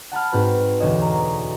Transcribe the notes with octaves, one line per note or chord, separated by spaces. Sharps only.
F#5 A5 B5 F6
G#2 C4 F#4 B4
E1 D2 C#5 D#5 E7
A#5